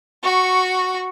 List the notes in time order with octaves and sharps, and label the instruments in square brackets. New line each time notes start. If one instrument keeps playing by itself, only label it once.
[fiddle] F#4 C#6